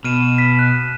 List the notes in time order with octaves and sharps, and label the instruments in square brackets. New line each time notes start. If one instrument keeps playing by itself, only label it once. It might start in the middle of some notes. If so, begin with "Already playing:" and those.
[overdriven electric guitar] B2 [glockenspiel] F6 D#7 E7
[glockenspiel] B6
F#6